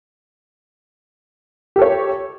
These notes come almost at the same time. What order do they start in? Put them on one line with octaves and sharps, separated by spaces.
G4 A4 C#5